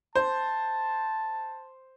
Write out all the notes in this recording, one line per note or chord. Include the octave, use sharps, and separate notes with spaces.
C5 A5